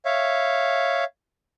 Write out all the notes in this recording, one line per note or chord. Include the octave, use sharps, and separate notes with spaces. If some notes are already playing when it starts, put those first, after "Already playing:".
C#5 E5 F5